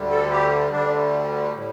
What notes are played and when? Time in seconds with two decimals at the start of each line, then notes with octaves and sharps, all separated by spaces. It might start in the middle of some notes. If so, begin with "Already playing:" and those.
Already playing: D2 D3 G3
0.10 A4
0.31 G4
0.71 D2 D3 G3 D4
1.53 A2 G3